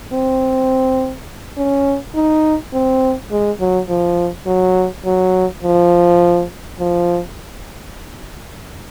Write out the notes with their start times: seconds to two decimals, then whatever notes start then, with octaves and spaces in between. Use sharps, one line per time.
0.13 C4
1.57 C#4
2.15 D#4
2.73 C4
3.31 G#3
3.60 F#3
3.89 F3
4.47 F#3
5.05 F#3
5.63 F3
6.79 F3